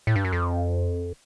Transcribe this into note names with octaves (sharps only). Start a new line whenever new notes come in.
A2
G2
F#2
F2